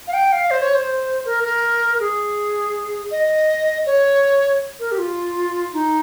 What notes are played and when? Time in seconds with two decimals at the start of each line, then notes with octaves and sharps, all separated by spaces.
0.07 F5
0.13 G5
0.32 F5
0.51 C5
0.62 C#5
0.75 C5
1.25 A#4
1.44 A#4
2.00 G#4
3.11 D#5
3.86 C#5
4.80 A#4
4.92 G4
4.98 F4
5.73 D#4